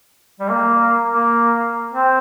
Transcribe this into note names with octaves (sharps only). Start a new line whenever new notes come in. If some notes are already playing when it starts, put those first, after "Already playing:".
G3
A#3
A#3
C4